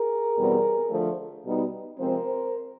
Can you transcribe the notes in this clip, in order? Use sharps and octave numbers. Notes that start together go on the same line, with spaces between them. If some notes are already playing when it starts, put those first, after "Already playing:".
Already playing: G#4 A#4
E2 B2 G3 C4
D3 F3 A3
B2 G3 B3 D#4
C3 F3 G#3 C4 A#4 C5